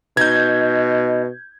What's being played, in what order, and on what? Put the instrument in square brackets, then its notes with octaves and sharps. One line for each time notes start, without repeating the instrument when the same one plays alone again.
[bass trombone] B2 [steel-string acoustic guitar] D#4 [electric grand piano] G6 G#6